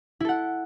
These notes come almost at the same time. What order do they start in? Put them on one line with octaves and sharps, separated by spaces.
E4 A4 F#5